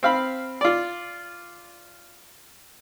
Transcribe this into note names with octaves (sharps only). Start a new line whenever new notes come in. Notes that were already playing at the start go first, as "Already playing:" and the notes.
C4 F5 B5
F4 D5